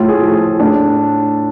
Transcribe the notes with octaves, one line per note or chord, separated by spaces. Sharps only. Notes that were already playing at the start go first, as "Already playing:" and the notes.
Already playing: A2 F4
G#4
F3
A2 D4